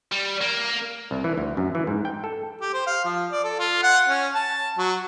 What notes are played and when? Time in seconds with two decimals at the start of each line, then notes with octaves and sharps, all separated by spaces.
0.12 G3
0.41 A#3
1.11 C2
1.24 E3
1.38 D2
1.57 F#2
1.75 E3
1.87 G#2
2.05 G5
2.24 A4
2.61 G4
2.73 C5
2.87 F5
3.05 F3
3.31 D5
3.44 A4
3.59 F4
3.83 F#5
4.08 C#4
4.34 A5
4.78 F#3